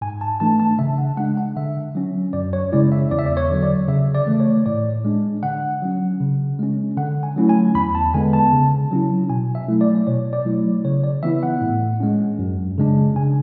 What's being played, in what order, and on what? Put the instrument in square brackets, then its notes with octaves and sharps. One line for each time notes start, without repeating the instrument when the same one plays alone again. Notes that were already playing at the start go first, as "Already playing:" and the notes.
[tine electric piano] G#2 G#5
A5
E3 A3 D4 A5
A5
C#3 E5
F#5
G#3 D4 F#5
F#5
D3 E5
F#3 C#4
F#2 D5
C#5
C#3 G#3 C#4 E4 D5
E5
E2 D5
E5
D5
C#5
D3 F#3
D5
C#3 E5
D5
E3 A3
C#5
A2 D5
G#3 D4
D3 F#5
F#3 C#4
C#3
G#3 C#4
D3 F#5
G#5
F#3 A3 C#4 E4
G#5
E2 B5
A5
D3 G#3 B3 G#5
A5
C#3
F#3 C#4 E4
B2 G#5
E5
F#3 A3 E4
D5
D5
B2 C#5
D5
F#3 A3 E4
C#3 C#5
D5
E3 B3 E4 E5
F#5
A2
G#3 C#4
F#2
C#3 G#3 D4
C#3 G#5